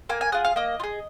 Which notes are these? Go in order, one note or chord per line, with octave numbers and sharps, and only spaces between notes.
A#3 G#5
G#5
F4 G#4 F#5
F5
A#3 D#5
F4
G#4